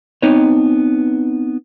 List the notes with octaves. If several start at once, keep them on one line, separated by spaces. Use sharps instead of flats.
B3 C4 D#4 B4 C#5